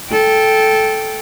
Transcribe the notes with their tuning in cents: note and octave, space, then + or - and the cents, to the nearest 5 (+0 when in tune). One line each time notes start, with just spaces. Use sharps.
A4 -10 G5 +0